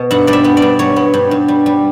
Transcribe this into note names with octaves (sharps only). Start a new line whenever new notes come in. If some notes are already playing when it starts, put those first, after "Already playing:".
Already playing: B2
G2 F#5
G2 D5
E5
B3
D5
G2
F#3 C#5
B3
G2
G2
G3
G3